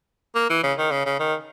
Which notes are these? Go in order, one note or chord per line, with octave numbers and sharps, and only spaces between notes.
A#3
E3
C#3
D#3
C#3
C#3
D#3